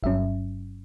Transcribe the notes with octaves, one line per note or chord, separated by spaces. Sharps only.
G1 G2 F#3 C#4 E5